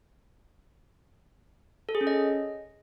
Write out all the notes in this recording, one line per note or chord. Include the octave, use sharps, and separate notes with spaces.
A4
G#4
C#4
D#5